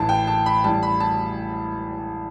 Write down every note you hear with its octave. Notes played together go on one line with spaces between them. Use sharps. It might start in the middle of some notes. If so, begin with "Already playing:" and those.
Already playing: A1 A2 E3 A5
G5
A5
B5
A1 A2 G3 A5
B5
A5